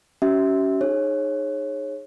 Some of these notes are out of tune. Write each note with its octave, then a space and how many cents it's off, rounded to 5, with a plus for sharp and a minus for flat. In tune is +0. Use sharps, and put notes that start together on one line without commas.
C#4 +10 F#4 +45 E5 -15
D#4 -25 G#4 +0 C#5 -25